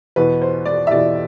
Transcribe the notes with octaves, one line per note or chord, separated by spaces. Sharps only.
E2 B2 B4
C5
D5
E5
E2 B2 D5